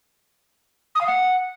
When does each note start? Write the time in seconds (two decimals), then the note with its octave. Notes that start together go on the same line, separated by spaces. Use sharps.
0.95 D#6
1.00 F5
1.06 F#5